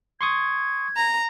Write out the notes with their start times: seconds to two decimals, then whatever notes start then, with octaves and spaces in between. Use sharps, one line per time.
0.21 C6 C#6 D#6 G#6
0.97 A#5